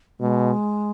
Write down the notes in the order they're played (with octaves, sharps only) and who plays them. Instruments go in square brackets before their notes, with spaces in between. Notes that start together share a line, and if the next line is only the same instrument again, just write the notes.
[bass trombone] B2 [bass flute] G#3